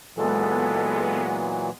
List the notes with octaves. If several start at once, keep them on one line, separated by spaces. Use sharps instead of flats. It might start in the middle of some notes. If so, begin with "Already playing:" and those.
A#2 E3 F#3 G#3 B3 A4